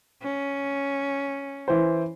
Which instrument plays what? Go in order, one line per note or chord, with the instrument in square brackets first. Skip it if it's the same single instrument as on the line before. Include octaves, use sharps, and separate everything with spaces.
[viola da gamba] C#4
[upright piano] E3 C5